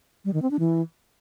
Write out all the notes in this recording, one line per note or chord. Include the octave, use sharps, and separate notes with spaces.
G3
D#3
C4
D4
E3